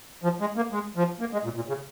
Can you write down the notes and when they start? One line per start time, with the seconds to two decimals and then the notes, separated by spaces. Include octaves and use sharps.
0.24 F3
0.40 G#3
0.56 A#3
0.72 G#3
0.96 F3
1.20 A#3
1.33 G#3
1.44 A#2
1.56 A#2
1.68 C#3